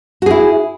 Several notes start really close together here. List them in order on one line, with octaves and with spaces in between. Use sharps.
F#4 G#4 E4